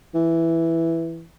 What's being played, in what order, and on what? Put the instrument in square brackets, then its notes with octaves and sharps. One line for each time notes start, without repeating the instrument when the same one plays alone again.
[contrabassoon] E3